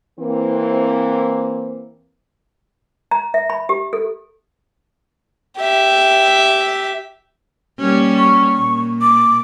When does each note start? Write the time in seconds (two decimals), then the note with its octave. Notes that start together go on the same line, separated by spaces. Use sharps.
0.20 E3 A#3 C4
3.11 A#5
3.34 E5
3.50 B5
3.69 G4
3.93 A4
5.59 G4 E5
7.80 G3 A#3 C#4
8.18 C#6
8.59 A#2
9.01 D6